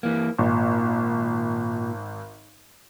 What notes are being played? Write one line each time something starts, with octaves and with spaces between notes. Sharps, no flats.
E3 A#3
G#1 A#2